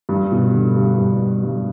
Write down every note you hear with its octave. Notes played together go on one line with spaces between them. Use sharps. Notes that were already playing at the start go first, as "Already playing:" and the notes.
G2
B2
D3
G2
G2
G2